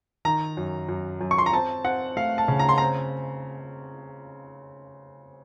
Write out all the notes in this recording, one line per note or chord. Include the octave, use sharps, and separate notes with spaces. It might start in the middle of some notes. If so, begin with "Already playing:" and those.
D#3 A#5
F#2
F#2
F#2
C#6
C6
A#5
C4 A5
C4 F#5
A3 F5
A5
C#3
A#5
C6
C4 A#5